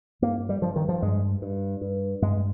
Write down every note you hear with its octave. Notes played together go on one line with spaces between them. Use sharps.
G2 A#3
G3
G2 F3
D#3
F3
G2 G#3
G2
G2
G2 G#3